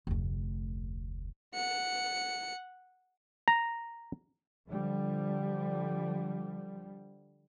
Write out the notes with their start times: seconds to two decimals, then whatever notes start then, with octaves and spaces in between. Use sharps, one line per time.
0.07 F1 D2
1.54 F#5 C#7
3.48 A#5
4.69 D3 F3 G3